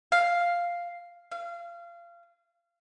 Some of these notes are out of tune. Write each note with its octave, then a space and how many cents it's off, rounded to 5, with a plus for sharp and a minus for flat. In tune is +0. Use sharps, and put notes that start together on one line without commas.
F5 +0
F5 -25